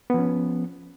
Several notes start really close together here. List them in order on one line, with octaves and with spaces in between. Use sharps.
B3 F3 C#4